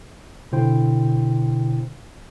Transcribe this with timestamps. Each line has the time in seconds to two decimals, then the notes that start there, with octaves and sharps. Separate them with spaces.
0.52 B2 D3 E4 C5 G5